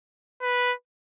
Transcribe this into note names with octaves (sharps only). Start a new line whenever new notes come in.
B4